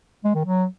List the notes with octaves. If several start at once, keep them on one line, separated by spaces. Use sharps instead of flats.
G#3
D#3
F#3